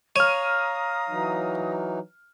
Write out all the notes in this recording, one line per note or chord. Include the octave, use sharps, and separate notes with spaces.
C#5 F5 A#5 D#6 F6 D#7
E3 F#3 D#4